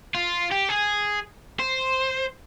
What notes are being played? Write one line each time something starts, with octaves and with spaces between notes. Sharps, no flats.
F4
G4
G#4
C5